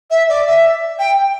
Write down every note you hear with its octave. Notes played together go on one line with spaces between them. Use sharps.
E5
D5
E5
G5